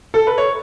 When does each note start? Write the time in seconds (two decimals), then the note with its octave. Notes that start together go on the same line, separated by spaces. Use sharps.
0.14 A4
0.27 B4
0.38 C#5